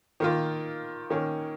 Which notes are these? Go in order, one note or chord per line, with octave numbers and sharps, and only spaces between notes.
D#3 A#3 F4
D#3 A#3 C#4